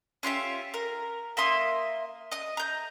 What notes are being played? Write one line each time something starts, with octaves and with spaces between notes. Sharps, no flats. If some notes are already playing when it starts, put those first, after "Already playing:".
C#4 F4 G4 E5
A#4
A#3 E5 C6 D#6
D#5 D#6
A#5 G6